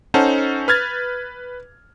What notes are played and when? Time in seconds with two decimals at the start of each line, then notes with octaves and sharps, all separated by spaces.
0.14 C#4 D#4 A4 C5 F#5 A5
0.68 B4 F6 G#6 A6